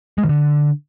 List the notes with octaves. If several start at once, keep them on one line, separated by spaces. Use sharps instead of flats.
G#3
D#3
D3